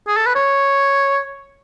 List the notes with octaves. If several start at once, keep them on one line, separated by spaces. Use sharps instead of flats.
G#4
A4
B4
C#5